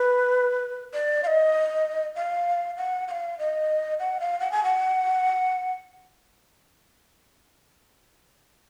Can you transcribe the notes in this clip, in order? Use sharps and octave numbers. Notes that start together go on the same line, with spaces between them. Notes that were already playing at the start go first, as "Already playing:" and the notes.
Already playing: B4
D5
F5
D#5
F5
F#5
F#5
F5
D#5
F#5
F5
F#5
G#5
F#5